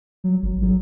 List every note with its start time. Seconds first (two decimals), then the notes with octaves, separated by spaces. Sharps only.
0.24 F#3
0.43 G#1
0.62 F#3